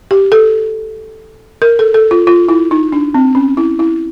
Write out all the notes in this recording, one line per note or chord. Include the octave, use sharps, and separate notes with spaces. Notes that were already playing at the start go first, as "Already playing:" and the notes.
G4
A4
A#4
A4
A4
F4
F4
E4
D#4
D4
C4
C#4
E4
E4